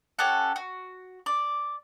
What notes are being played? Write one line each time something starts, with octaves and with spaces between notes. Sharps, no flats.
C#4 G4 A4 F#5
F#4
D5